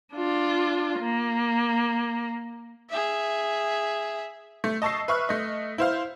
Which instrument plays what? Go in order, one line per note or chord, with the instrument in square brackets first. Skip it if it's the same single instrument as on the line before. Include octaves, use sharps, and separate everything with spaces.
[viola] D4 F4
A#3
[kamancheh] G#4 E5
[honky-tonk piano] A3
D#5 A5 C#6 E6 C7
B4 E5 C#6 F6 F#6
A3 D#5
E4 C5 F5